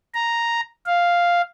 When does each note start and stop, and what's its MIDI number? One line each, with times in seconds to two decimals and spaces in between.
0.15 0.61 82
0.86 1.41 77